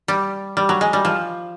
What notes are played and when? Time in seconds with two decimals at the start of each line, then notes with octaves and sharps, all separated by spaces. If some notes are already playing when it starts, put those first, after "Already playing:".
0.08 G3
0.57 G3
0.69 F#3
0.81 G#3
0.93 G3
1.05 F3